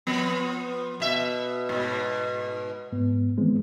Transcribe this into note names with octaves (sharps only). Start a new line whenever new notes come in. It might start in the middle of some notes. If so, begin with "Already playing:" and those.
F3 B3
B2 E5
G#2 B2
G#2 B3
D#3 E3 G#3 B3 C4